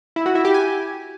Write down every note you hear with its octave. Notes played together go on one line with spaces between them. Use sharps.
E4
F#4
E4
G4
G#5